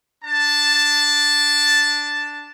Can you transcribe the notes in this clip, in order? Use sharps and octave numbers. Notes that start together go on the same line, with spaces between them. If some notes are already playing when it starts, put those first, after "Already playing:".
D4 A5